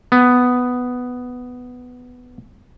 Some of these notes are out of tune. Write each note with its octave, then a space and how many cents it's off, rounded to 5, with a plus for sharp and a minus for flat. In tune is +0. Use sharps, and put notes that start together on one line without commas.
B3 +5